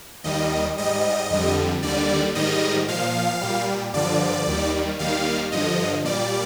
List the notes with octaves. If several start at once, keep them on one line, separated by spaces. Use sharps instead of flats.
D#2 D#3 G3 D#5
G#2 G3 D#5
F2 D3 G3
D#2 D3 G3 D5
G#2 D#3 G3 D#5
A#2 F3 F5
A#2 G3
G2 D3 F3 D5
D#2 D#3 G3
D#2 D#3 G3 F5
G2 D3 F3 D#5
A#2 G3 D5